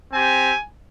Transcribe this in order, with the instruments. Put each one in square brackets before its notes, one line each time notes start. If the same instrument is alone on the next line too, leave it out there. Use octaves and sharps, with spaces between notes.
[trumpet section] C4 G4 G#5